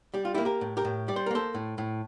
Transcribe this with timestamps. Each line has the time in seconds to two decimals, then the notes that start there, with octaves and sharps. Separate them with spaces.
0.14 G3 G4
0.25 F4
0.34 A#3 E4 G4
0.45 G4 A#4
0.61 A2
0.77 G4 A#4
0.85 A2
1.08 G3 D5
1.16 C5
1.26 A#4
1.31 A#3 A4 C5
1.54 A2
1.78 A2